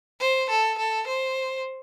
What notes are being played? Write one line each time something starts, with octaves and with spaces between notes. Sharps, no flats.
C5
A4
A4
C5